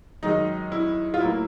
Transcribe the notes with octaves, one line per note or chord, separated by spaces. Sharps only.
F#2 D#3 G#3 D#4
E4
F4
A2 F#3 A#3 E4